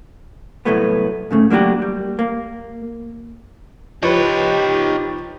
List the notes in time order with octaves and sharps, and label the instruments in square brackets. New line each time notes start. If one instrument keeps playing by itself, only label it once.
[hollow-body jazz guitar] C2 A2 F#3 A3 B3
G#2 C#3 A3
F#3 A#3 D4 F#4 G4
G3
A#3
[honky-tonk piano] F3 B4 [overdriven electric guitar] D#4 C#5 [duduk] G4